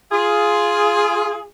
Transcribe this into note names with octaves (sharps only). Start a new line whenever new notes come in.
F4 G#4